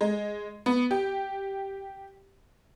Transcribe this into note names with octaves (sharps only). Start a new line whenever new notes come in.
G#3
B3
G4